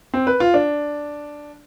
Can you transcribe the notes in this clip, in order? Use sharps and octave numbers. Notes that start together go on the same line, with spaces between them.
C4
B4
F4
D4